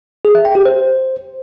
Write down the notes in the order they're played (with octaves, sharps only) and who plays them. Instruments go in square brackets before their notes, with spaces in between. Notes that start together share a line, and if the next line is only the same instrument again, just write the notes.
[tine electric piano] G#4
E5
G5
G4
C5